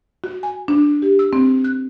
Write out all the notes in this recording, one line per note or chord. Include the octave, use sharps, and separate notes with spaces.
F#4
G#5
D4
G4
E6
C4
F#6